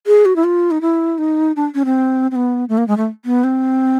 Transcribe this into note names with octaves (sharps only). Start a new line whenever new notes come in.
G#4
F#4
E4
F4
D#4
E4
D#4
D4
C#4
C4
C4
B3
A3
A#3
G#3
A3
B3
C4